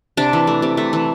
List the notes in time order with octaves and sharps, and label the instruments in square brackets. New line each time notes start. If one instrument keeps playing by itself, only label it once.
[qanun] C3 D4
E3
A3
C3
A3
E3